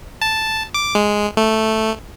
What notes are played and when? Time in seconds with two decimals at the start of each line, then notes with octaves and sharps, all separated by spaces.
0.22 A5
0.74 D6
0.95 G#3
1.37 A3